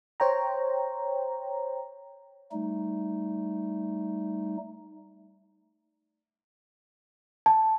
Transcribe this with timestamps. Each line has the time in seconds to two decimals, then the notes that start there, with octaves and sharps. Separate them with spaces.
0.20 C5 C#5 G5 A#5
2.52 G3 A3 D#4
7.46 A5